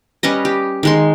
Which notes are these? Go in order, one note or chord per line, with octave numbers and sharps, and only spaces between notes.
G3 C#4 B4 D#5
G4
D#3 G#3 C6